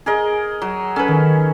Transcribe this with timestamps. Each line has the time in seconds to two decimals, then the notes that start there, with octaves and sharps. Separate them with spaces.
0.06 G#4 A#4 D#5
0.62 F#3
0.96 C#4 A4 B4
1.08 D#3